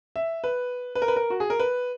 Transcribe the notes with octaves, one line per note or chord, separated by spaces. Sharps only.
E5
B4
B4
A#4
B4
A#4
F#4
G#4
A#4
B4